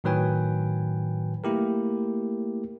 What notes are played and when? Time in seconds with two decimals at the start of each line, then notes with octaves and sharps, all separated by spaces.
0.04 A2 D#3 F#3 B4 G5 G#5
1.44 A3 A#3 E4 G4 A#4